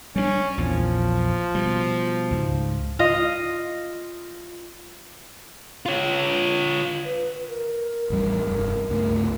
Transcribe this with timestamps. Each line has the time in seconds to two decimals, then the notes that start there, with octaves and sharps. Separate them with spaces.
0.16 G3 A3 C#4 D4
0.57 A#1 E2 A#2 F3
1.55 B2 G3
2.31 C#2 G#2
2.99 F4 D#5
5.86 F4 C#5
7.05 B4
7.48 A#4
8.10 A1 F2 G3
8.46 F1 G2
8.89 C#2 G2 A3